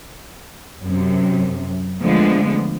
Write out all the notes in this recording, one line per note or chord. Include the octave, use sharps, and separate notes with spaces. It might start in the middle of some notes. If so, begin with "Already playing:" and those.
F#2 C3
D3 F3 G#3 A3 B3